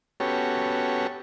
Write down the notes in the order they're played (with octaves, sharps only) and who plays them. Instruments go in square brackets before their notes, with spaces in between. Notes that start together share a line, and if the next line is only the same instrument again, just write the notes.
[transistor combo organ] B3 C#4 F#4 G4 A4 C#5